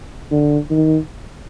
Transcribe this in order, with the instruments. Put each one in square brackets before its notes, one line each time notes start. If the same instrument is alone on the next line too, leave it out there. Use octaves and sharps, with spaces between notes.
[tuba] D3
D#3